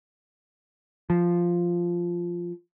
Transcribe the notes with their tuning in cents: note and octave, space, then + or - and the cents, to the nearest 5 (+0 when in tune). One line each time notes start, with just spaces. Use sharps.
F3 -5